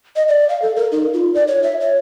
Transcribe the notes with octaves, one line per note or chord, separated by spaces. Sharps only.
D#5
D5
F5
A4
A#4
D#4
F4
D5
C#5
E5
C#5